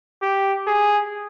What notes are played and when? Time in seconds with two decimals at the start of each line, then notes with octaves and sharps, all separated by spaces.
0.22 G4
0.67 G#4